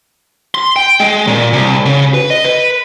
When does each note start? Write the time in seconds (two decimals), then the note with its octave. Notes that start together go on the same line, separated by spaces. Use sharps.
0.55 C6
0.76 G5
1.00 G#3
1.27 A#2
1.53 C2
1.86 C#3
2.14 B4
2.30 D#5
2.45 B4